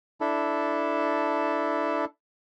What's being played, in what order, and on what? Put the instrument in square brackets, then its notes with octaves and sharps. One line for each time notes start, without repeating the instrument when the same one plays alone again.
[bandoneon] D4 E4 A4